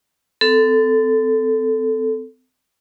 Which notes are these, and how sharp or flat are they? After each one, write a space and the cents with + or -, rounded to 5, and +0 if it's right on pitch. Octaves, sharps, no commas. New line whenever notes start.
C4 -40 A4 +0